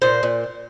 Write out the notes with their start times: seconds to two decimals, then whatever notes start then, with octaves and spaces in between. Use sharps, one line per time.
0.02 A#2 C5
0.23 A#2